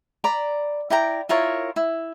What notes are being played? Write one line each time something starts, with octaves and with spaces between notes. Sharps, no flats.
D5 A#5 B5
E4 D5 G5 A#5
E4 F4 A#4 C#5
E4